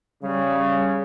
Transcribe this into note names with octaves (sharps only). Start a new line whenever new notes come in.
C#3 G3